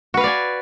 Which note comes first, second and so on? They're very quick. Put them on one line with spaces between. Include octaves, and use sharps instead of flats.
F#4 B4 F5 D5 G#5